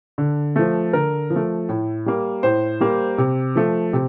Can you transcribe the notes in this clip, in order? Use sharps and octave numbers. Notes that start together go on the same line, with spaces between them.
D3
F3 A3
D3 A#4
F3
A3
A2
G3 A#3
A2 C5
G3 A#3
C3
F3 A3
C3